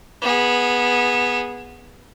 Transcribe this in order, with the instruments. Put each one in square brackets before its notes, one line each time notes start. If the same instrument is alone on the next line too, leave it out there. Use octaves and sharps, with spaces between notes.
[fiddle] B3 G#4